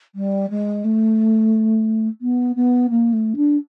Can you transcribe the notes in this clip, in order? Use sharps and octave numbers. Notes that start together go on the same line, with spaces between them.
G3
G#3
A3
B3
B3
A#3
A3
D4